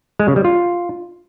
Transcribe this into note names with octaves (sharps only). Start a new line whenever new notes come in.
G#3
C#3
G3
F4